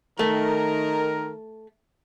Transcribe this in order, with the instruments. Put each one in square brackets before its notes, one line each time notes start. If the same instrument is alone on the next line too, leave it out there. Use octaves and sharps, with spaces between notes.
[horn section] D#3 A#4 [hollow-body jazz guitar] A3